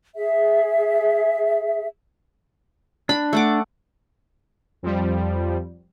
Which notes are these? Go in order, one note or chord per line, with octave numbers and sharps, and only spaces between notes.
G#4 E5
D4 B5
A3 F#5 D6
F2 F3 G3